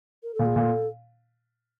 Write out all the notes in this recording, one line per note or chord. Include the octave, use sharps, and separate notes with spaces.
A#4
A4
A#2
G#4
A#2 A4